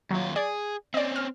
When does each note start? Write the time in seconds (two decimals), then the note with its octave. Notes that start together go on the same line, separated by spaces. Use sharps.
0.11 D#2 F#3 F4
0.36 G#4 D5
0.94 C4 C#4 D5 D#5
1.16 F6